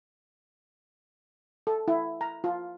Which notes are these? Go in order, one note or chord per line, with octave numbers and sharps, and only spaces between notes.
A4
E4
A#5
F4